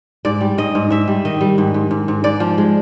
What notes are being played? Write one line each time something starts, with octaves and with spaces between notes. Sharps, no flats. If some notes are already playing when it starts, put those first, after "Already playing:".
G#2 D5
G3
G#2 D#5
G#2
G#2 E5
G3
D#3 D#5
G3
G#2
G#2
G#2
G#2
G#2 D5
F3
G#3